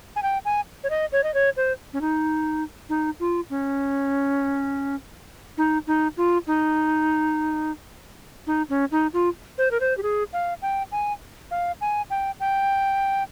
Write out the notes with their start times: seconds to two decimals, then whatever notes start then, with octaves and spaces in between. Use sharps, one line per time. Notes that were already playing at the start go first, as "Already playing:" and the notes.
0.16 G#5
0.23 G5
0.45 G#5
0.84 C#5
0.90 D#5
1.12 C#5
1.24 D#5
1.34 C#5
1.57 C5
1.93 C#4
2.01 D#4
2.89 D#4
3.20 F4
3.50 C#4
5.58 D#4
5.87 D#4
6.17 F4
6.47 D#4
8.47 D#4
8.69 C#4
8.91 D#4
9.13 F4
9.58 C5
9.71 A#4
9.80 C5
9.98 G4
10.03 G#4
10.33 F5
10.62 G5
10.92 G#5
11.51 F5
11.81 G#5
12.10 G5
12.40 G5